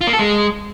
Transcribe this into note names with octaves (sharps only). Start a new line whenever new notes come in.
F4
A#3
A4
G#3